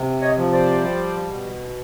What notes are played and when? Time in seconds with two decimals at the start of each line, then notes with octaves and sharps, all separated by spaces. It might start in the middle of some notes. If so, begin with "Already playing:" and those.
Already playing: C3
0.21 C#5 D#5
0.38 F3
0.52 C5 D5
0.82 G3
1.28 B2